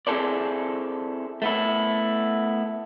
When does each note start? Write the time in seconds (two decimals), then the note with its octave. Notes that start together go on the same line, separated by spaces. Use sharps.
0.07 C4 E4 G#4 A4 C5 D5
1.42 A3 B3 E4